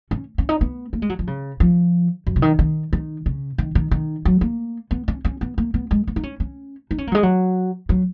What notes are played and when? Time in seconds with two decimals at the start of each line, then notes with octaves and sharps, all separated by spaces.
0.11 C#4
0.38 C#4
0.49 D#4
0.61 B3
0.93 A#3
1.02 G#3
1.09 F#3
1.19 F3
1.27 C#3
1.60 F3
2.27 F#2
2.36 C#3
2.42 D#3
2.59 D#3
2.93 D#3
3.26 C#3
3.58 D#3
3.75 D#3
3.91 D#3
4.25 F#3
4.41 A#3
4.91 B3
5.08 C#4
5.25 C#4
5.41 B3
5.58 A#3
5.74 B3
5.91 G#3
6.07 B3
6.16 D#4
6.23 C#4
6.40 C#4
6.91 D#4
6.98 C#4
7.07 A#3
7.12 F#3
7.15 G#3
7.23 F#3
7.89 F#3